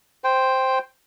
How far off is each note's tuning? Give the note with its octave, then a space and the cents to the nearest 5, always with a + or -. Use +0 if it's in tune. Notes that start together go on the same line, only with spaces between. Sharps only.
C5 +0 G5 +0